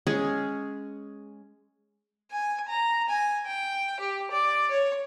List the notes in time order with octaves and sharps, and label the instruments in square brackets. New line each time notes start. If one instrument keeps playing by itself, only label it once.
[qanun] G#3 C#4 G#4
[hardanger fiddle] G#5
A#5
G#5
G5
G4
D5
C#5